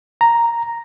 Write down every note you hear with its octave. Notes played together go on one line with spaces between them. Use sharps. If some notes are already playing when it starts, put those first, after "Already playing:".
A#5